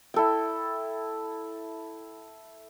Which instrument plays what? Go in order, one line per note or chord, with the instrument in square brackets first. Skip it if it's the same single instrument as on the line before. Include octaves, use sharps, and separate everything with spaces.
[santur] E4 A4 G5